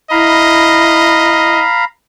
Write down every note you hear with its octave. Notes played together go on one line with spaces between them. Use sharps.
E4 D#5 F5 A#5 B5